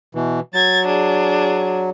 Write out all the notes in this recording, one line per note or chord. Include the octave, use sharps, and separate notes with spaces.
B2 E3
F#3 G#6 A6
D4 G#4